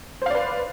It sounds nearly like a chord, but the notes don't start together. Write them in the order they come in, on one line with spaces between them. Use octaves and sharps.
C5 F5 D5 B4